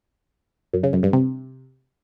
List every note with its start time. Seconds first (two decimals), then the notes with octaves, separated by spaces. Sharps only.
0.73 F#2
0.83 C#3
0.93 F#2
1.03 G2
1.13 C3